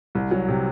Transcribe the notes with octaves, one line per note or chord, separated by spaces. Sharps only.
C2
F#3
C3